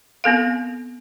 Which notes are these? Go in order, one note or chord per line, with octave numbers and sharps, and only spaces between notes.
B3 C4 A4 F5